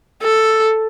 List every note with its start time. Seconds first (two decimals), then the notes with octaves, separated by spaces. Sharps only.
0.23 A4